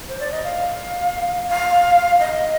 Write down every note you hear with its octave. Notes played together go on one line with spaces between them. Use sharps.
C5
D5
D#5
F5
F5
D#5